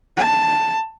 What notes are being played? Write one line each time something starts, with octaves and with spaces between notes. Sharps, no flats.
A5